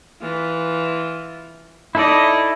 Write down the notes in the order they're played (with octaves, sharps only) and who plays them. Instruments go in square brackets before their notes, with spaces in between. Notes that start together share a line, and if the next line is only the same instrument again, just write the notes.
[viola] E3 F4
[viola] D#4 D#5 [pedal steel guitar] E4 A4 D5